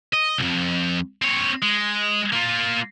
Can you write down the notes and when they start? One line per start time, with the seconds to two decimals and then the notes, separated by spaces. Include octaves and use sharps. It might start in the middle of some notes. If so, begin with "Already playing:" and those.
0.13 D#5
0.38 C2 F2
1.22 C4 C#5
1.62 G#3
2.33 A#3 F4